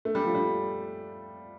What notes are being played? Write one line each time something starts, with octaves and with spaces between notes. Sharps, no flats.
A3
G3
F3
G3